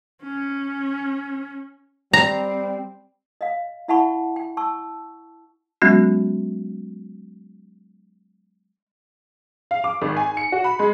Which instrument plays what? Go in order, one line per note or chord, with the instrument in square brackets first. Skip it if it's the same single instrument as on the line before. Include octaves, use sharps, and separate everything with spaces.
[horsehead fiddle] C#4
[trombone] G3 [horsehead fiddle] C4 [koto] A#5
[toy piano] D#5 F5
E4 E5 F#5 A5 B5 C#6
G5
A5 C#6 E6
[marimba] F#3 G#3 B3 C#4 F#4
[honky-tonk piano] F5
D6
G#1
G#5
C#7
F#4
B5
G#3